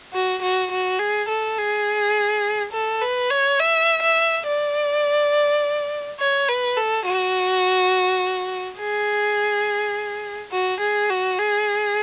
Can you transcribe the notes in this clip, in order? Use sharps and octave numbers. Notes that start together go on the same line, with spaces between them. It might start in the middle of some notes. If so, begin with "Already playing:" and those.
F#4
F#4
F#4
G#4
A4
G#4
A4
B4
C#5
E5
E5
D5
C#5
B4
A4
F#4
G#4
F#4
G#4
F#4
G#4